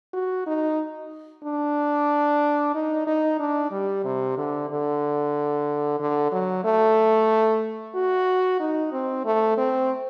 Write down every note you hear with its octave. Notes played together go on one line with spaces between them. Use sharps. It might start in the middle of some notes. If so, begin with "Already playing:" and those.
F#4
D#4
D4
D#4
D#4
D4
G3
C3
D3
D3
D3
F#3
A3
F#4
D#4
C4
A3
C4